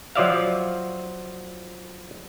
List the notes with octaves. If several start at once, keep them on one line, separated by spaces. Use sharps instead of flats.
F3 F#3 F4 D5 E5 F5